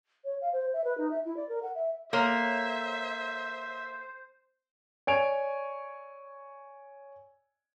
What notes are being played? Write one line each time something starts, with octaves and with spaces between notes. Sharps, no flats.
C#5
F5
C5
E5
B4
D#4
E5
E4
D5
A#4
F#5
E5
A#3 A4 C5 C#5 E5 C6
C#5 D5 G#5 G#6 D7 F7